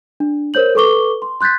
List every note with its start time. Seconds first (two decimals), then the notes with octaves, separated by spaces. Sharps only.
0.20 D4
0.54 A#4 C5 C#5 G6 F#7
0.75 A4 B4 C#6 D6 G7
1.22 C6
1.41 C6 F#6 G6 A6 B6